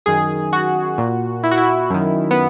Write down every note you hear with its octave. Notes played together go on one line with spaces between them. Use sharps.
F#2 D#3 G#4
F#4
A#2
E4
F#4
E4
F#2 D#3
B3